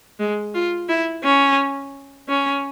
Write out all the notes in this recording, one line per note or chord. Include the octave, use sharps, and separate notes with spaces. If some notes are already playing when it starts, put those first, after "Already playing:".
G#3
F4
E4
C#4
C#4